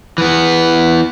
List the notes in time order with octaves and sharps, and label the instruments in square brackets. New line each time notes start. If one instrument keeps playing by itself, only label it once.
[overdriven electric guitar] E3 B3